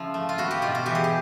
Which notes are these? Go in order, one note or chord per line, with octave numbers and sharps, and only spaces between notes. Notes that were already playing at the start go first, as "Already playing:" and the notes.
Already playing: C#3 F3 E4
A3
F4
B3 F#4
G4
B2 F4
F#4
E3 G4
G#4
G4